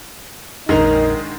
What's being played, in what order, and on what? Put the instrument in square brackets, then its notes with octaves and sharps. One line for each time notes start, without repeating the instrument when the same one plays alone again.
[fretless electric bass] A#1 F2 [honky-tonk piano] D3 D#3 G#3 [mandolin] C#4 A#4 [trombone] D#4